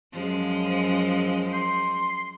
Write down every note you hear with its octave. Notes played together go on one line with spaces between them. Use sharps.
F#2 F3 G#3
C6